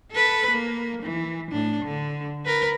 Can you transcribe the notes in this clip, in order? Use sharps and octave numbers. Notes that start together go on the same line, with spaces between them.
A4 B4
A#3
E3
A2 D4
D3
A#4 B4